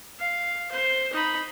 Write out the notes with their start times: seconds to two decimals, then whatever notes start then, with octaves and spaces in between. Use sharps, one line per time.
0.19 F5
0.71 C5
1.13 D#4 B5